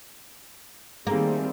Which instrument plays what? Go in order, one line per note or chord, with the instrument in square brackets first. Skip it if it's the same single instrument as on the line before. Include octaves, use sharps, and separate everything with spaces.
[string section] D#3 G3 C4 [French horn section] A3 G#4 [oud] A#3